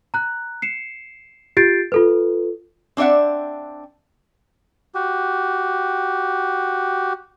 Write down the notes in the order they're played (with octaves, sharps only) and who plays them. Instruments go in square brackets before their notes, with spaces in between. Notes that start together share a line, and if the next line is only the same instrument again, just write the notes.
[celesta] A#5 F#6
C7 C#7 E7
F4 G4 G6 A6 C7 D7
F4 A4 B4
[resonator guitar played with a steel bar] C4 D4 D5 E5 F#5
[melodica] F#4 G4